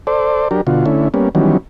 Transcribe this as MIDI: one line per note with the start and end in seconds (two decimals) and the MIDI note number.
0.07 0.48 69
0.07 0.48 72
0.07 0.48 74
0.51 0.61 54
0.51 0.61 62
0.51 0.61 67
0.51 0.61 70
0.67 0.85 47
0.67 0.85 50
0.67 0.85 65
0.67 0.85 66
0.86 1.08 50
0.86 1.08 57
0.86 1.08 61
0.86 1.08 64
1.14 1.29 55
1.14 1.29 58
1.14 1.29 59
1.14 1.29 61
1.35 1.57 51
1.35 1.57 52
1.35 1.57 54
1.35 1.57 55
1.35 1.57 59
1.35 1.57 61